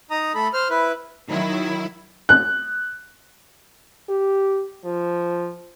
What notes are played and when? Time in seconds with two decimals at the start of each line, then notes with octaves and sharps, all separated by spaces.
0.11 D#4 A#5 D#6
0.35 A3 A4 B5
0.54 C5 F6
0.70 E4 B4
1.30 D#3 F#3 E4
2.29 F#6
4.09 G4
4.85 F3